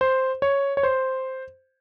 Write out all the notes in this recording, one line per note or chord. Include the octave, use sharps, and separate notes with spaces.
C5
C#5
C#5
C5